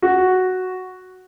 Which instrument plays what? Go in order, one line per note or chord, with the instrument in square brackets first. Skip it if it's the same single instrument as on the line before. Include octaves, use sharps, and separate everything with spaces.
[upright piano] F#4